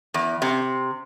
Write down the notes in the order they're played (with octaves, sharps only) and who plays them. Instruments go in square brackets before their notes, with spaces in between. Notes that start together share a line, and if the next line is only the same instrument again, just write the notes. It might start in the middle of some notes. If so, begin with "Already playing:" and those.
[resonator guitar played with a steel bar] E2
C3